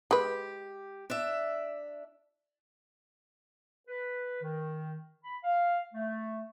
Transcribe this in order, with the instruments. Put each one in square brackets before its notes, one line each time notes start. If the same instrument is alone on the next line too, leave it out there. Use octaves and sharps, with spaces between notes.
[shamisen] G#3 B4 [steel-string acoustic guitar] G4
[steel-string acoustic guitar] D4 E5
[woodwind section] B4
D#3
B5
F5
A3